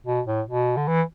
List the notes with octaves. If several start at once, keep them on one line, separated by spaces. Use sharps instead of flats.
B2
A2
B2
D3
E3